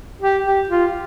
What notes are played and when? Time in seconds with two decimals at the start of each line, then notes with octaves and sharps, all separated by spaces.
0.21 G4
0.45 G4
0.69 F4